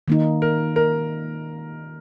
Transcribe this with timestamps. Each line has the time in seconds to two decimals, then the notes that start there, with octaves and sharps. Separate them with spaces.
0.08 D#3 A#3 D#4
0.42 A#4
0.76 A#4